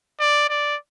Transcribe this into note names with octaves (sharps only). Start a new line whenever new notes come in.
D5
D5